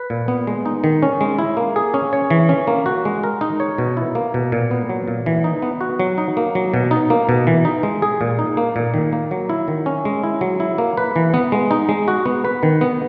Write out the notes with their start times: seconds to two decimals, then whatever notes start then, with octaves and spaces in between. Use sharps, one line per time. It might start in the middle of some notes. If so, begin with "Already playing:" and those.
Already playing: B4
0.10 A#2
0.28 B3
0.47 G#3
0.66 D#4
0.84 D#3
1.03 C#4
1.21 G#3
1.39 E4
1.57 A#3
1.76 G#4
1.94 C#4
2.13 C#5
2.30 E3
2.49 C#4
2.67 A#3
2.86 F#4
3.05 G#3
3.23 A#4
3.41 D#4
3.60 C#5
3.78 B2
3.97 E4
4.15 A#3
4.34 B2
4.52 A#2
4.71 B3
4.90 F#3
5.08 A#2
5.26 E3
5.44 D#4
5.62 B3
5.81 F#4
6.00 F#3
6.18 D#4
6.37 A#3
6.55 F#3
6.74 B2
6.91 D#4
7.10 A#3
7.29 B2
7.47 E3
7.65 D#4
7.83 G#3
8.02 G#4
8.21 A#2
8.39 D#4
8.57 A#3
8.76 A#2
8.94 D#3
9.13 A#3
9.31 F#3
9.50 E4
9.68 D#3
9.86 C#4
10.05 G#3
10.24 E4
10.41 F#3
10.60 E4
10.78 A#3
10.97 B4
11.16 E3
11.34 B3
11.52 G#3
11.71 D#4
11.89 G#3
12.08 F#4
12.26 B3
12.45 B4
12.63 D#3
12.81 B3